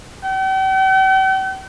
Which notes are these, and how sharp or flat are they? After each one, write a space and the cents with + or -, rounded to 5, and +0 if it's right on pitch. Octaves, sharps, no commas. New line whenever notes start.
G5 -45